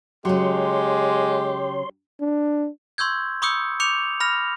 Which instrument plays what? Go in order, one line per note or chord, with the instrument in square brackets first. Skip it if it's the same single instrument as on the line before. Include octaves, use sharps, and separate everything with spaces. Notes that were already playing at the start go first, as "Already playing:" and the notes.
[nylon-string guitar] C#3 F#3 [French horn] G#3 [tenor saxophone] G4 [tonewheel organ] C#5 C6
[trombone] D4
[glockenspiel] C6 C#6 E6 G6 G#6
B5 C#6 D#6 E6 G6 C#7
D6 G6 C#7 F7
B5 F6 A#6 F7